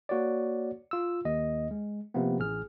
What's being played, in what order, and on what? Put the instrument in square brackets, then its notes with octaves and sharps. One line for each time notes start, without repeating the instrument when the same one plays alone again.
[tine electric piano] A#3 F#4 C#5 D5
F4 E6
D#2 D#5
G#3
C3 F3 A#3 B3
A1 G#4 F6